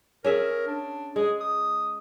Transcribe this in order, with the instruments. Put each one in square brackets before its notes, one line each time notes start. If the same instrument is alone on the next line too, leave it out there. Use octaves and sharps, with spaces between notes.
[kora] C#4 G#4 E5 [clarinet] A#4
[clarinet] D4
[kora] G#3 [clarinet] G#4
[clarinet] D#6